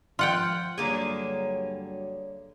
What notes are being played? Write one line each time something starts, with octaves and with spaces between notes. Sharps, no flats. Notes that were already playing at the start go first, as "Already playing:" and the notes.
F3 F4 F#5 G5
G2 D3 F#3 A#3 G#4 C#5